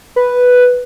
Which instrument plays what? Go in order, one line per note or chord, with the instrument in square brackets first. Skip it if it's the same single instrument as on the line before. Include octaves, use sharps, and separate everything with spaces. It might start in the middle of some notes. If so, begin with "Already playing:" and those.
[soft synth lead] B4